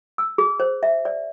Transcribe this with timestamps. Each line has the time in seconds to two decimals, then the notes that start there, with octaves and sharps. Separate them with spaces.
0.18 E6
0.38 G#4
0.60 C5
0.83 E5
1.05 D5